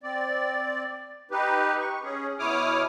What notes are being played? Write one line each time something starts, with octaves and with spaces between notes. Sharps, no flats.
C4 D5
D#4 G4 B4
C#6
C#4 G#4
B2 E4 C#5 D6 D#6 F6